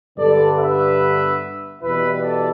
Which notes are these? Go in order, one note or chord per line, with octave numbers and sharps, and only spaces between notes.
G2 D3 B3 A4 D5
B4 E5
E2 B2 G3 E4 B4 E5
A4 D5